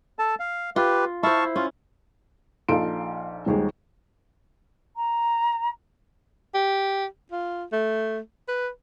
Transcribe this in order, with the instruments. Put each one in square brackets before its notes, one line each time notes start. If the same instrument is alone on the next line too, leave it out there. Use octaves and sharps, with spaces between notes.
[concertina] A4 A5
F5
[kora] F4 [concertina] G4 B4
[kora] E4 C5 [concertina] F5 A5 C#6
[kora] C#4 [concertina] F4
[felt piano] A#1 D#4 A4 F5 C6 D7
D#1 D#2 G#3
[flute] A#5
[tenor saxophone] G4
F4
A3
B4